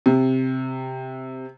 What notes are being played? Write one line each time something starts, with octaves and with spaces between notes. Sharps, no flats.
C3